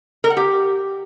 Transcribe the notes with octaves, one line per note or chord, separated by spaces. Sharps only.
A#4
F#5
G4